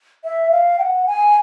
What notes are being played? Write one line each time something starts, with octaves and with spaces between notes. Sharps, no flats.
E5
F5
G5
F#5
G#5